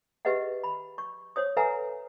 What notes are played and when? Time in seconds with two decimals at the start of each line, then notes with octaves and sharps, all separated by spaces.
0.25 G4 G#4 B4 D#5 E5 F#5
0.64 B5
0.98 C#6
1.36 C5 C#5 D#6
1.57 A4 B4 E5 F#5 G#5 A#5